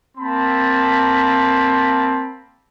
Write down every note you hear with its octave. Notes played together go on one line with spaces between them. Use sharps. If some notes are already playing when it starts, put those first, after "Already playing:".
A#3 C4 A5 B5